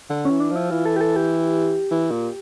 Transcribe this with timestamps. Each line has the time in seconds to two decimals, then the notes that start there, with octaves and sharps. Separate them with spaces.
0.10 D3
0.25 C#4
0.30 E3
0.40 D4
0.51 F3 E4
0.71 E3 F4
0.86 A4
0.96 G4
1.01 A4
1.16 G4
1.91 E3
2.11 A#2